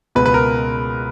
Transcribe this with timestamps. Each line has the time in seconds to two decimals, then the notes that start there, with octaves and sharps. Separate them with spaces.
0.15 C#2 B2 B4
0.26 B4
0.34 A#4